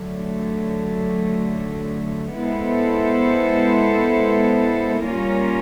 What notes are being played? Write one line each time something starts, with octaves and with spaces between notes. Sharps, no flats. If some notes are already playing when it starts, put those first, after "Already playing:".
Already playing: D3 F#3 A3
G#3 B3 E4 A4 C5
G3 A#3 C#4 F4 A#4